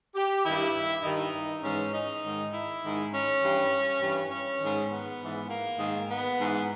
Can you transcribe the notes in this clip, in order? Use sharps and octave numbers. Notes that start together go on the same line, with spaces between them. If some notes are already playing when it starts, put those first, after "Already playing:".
G4
G2 D#3 E4
G2 D#3 D#4
G#2 E3 C#4
D#4
G#2 D#3
E4
G#2 D#3
C#4
G2 E3
G2 E3
C#4
G#2 D#3
B3
G#2 E3
A#3
G#2 D#3
B3
G#2 E3